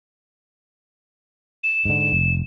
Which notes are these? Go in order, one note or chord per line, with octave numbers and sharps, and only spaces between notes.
E7
G#2 D3
F1